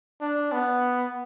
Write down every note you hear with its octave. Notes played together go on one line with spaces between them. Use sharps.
D4
B3